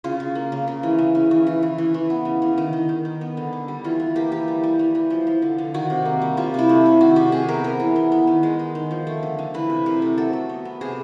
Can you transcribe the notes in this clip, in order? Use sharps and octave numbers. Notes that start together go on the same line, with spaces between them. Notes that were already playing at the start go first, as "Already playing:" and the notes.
C#3 F4
C#3
A#3
C#3
C#3
E3
C#3
C#3
E3
E3
E3
E3
E3
B3
C#3
E3
D#3
D#3
D#3
D#3
B3
D3
D3
G3
E3 F4
E3
A#3 G4
E3 G4
G3
G3
E3
E3
F3
F3
D3
D3
D#3 F#4
C3
A#3
G3
C3 F4
C3 E4
A3
C3
D#3 F#4
C3 G4
C3 G#4
B3 A#4
B3 A#4
E3
B3
B3
D#3
G#3
G#3
D#3
F3
A3
D3
D3
E3 B4
C3
C3 A#4
A3
F#3 A4
F#3
B3
B3
C3 G#4